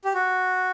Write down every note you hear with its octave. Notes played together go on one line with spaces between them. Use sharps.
G4
F#4